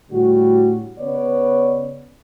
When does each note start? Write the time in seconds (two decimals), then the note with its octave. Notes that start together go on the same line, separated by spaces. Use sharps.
0.11 A2 D3 G3 F#4
0.98 C#3 B3 B4 C#5 D5